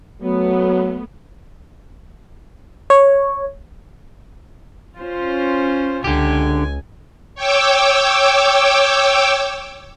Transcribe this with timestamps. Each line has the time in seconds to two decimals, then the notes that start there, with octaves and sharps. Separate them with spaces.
0.22 F#3 A3 B3
2.90 C#5
4.99 C#4 F4 C5
6.04 C#2 D3 G4 G#5
7.35 C#5 G5 D6 E6